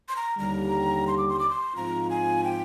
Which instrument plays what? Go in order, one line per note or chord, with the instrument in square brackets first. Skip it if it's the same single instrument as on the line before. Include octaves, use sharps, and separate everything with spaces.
[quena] C6
A#5
[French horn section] D#2 D3 G3 [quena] A#5
[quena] C6
D6
C6
D6
C6
[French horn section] G#2 F3 C4 F4 [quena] A#5
[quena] G#5
G5